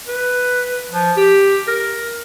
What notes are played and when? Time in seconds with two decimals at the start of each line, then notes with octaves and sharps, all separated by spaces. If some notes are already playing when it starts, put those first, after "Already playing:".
0.08 B4
0.91 F3
1.17 G4
1.68 A#4